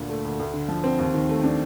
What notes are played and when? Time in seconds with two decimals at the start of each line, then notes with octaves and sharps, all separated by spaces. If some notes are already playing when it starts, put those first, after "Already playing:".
Already playing: D2 A#2 D3
0.09 A3
0.25 D2
0.40 D2
0.54 D3
0.68 F3
0.84 C4
0.99 D#2
1.14 D#3
1.29 A3
1.44 D4